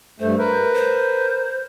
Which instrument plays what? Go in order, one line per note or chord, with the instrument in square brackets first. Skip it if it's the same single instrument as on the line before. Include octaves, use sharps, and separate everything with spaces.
[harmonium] G2 A3 [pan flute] C5
[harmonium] A#4 B4
[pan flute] C5